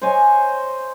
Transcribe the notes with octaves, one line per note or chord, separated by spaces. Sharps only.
C5 C#5 D#5 G#5